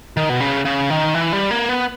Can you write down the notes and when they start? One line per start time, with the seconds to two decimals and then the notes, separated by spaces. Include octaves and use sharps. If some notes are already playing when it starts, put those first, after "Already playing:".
0.17 D#3
0.29 B2
0.40 C#3
0.65 C#3
0.90 D#3
1.14 E3
1.33 G3
1.51 A#3
1.69 B3